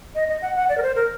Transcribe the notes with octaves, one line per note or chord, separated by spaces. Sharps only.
D#5
D#5
F#5
F#5
D5
A#4
C5
A#4